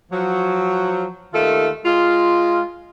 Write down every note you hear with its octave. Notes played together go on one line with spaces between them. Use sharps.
F3 F#3
D#2 D#3 A3 F4 A4
G#3 F4